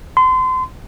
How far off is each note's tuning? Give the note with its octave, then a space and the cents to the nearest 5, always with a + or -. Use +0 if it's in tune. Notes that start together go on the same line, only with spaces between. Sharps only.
C6 -30